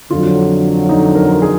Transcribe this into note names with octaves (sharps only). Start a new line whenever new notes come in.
F2 D3 F#3 F4
D#4
A#4
G#4